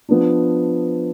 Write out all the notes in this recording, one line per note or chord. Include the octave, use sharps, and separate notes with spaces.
F3 B3 D4